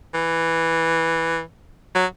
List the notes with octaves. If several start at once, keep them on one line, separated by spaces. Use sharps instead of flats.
E3
F#3